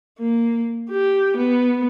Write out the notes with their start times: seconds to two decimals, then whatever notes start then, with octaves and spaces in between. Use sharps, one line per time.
0.19 A#3
0.90 G4
1.37 B3